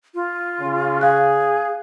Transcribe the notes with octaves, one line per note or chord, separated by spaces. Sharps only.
F4
C#3
G#4 F5 F#6